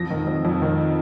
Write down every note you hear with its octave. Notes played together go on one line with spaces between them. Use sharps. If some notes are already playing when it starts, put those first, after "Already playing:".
Already playing: F2 A#6
D#3
F2
F2
D#3